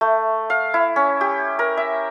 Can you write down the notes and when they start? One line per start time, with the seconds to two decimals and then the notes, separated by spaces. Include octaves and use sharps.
0.01 A3
0.50 F5
0.74 E4
0.96 C#4
1.21 G4
1.59 A#4
1.77 E5